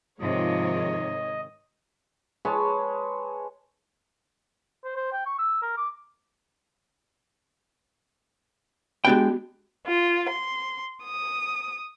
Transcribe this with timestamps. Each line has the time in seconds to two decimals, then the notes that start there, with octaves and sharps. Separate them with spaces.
0.20 G#2 C3 D#3 F3 G#3 C#5 D#5
2.45 G#3 B4 C#5 A5
4.85 C5
4.96 C5
5.12 G5
5.26 C#6
5.39 E6
5.62 A#4
5.77 D6
9.05 G#3 B3 D4 F#4 G4 G5
9.86 F4
10.29 C6
11.02 D#6